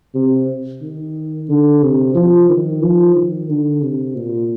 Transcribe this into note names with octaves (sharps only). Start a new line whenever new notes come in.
C3
D#3
D3
C3
F3
D#3
F3
D#3
D3
C3
A#2